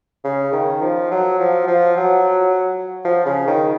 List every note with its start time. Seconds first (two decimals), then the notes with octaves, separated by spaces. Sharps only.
0.24 C#3
0.53 D#3
0.82 F3
1.11 F#3
1.40 F3
1.67 F3
1.97 F#3
3.05 F3
3.26 C#3
3.47 D#3